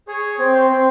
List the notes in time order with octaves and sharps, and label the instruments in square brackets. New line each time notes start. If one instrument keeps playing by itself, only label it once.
[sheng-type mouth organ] G#4 [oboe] C#5
[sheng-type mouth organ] C4
[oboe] C5
[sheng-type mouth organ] C4